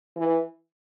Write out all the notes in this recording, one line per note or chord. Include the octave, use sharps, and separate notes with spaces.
E3